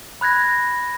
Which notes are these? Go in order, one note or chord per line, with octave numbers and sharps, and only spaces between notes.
B5 F#6 G#6 A#6